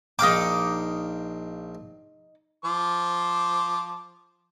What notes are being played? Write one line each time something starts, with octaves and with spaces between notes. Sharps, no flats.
A#1 D#4 F5 G5 D6
F3 C5 D6